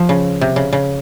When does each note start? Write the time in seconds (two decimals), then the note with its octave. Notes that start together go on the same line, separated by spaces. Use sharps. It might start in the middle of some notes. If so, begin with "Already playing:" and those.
Already playing: F3
0.09 C#3
0.41 C3
0.56 C#3
0.73 C#3